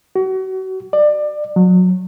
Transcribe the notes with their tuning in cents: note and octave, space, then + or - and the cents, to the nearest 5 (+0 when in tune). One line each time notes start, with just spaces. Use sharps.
F#4 +35
D5 +25
F#3 -25